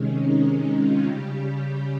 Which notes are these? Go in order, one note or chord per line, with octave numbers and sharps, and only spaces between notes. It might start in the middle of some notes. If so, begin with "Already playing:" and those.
Already playing: C3 D#3 G#3 C#4
D#4
D#4
F4
C#3 G3 G4